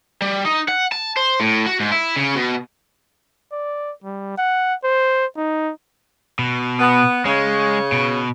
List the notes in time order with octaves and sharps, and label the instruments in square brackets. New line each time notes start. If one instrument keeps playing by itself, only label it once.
[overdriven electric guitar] G3
D#4
F#5
A5
C5
A2
F#4
G#2
E4
C#3
B2
[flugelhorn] D5
G3
F#5
C5
D#4
[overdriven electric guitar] B2
[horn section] B3
[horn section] C#3 C#5 [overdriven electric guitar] G#3
[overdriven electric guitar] B2